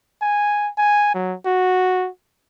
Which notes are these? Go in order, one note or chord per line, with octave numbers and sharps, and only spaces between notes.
G#5
G#5
F#3
F#4